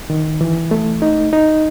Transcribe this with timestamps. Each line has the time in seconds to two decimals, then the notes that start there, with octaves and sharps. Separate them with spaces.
0.10 D#3
0.41 E3
0.71 A3
1.02 D#4
1.33 D#4